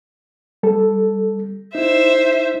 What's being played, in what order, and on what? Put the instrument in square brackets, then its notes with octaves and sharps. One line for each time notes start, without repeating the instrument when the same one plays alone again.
[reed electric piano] G3 A4
[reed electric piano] D#4 E4 [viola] C5 E5